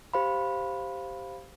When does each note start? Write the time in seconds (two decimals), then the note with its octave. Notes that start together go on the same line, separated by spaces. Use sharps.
0.14 G4 C5 F5 B5